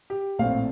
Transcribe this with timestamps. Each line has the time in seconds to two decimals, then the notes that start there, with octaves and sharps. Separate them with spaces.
0.10 G4
0.39 A#1 A2 A3 C4 F5